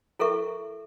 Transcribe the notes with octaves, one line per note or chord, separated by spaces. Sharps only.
E4 A4 A#4 E5 C#6